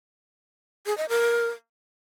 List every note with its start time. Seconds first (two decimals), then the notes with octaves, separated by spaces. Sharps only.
0.86 G#4
0.98 D#5
1.09 A#4